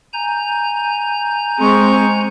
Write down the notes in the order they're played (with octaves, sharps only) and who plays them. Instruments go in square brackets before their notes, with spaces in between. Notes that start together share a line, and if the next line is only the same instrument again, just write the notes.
[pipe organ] G#5 A#5 G6
[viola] G#3 C#6 [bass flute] C4